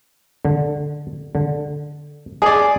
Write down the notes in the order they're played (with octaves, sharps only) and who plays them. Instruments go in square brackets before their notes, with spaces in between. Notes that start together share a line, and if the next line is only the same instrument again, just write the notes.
[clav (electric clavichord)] D3
D3
[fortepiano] G#4 D5 [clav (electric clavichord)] D#5